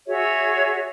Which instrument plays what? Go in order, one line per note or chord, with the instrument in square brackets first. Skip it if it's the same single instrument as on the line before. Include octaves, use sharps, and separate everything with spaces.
[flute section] F#4 G#4 C#5 E5